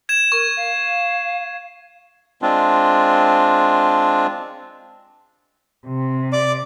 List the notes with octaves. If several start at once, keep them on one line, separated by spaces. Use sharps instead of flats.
G#6 E7
A#4 C#6
F5
G#3 C4 D4 F4
C3
D5 D6